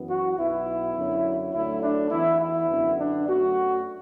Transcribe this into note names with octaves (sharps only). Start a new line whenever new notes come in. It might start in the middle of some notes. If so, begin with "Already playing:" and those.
Already playing: F#2 E3 B3
F#4
B1 B2 B3 E4
F#2 D3 F#3
D2 D3 F#3 A3 E4
D4
E2 E3 B3 E4
E4
F#2 D3 B3
D4
F#2 F#3 A3 F#4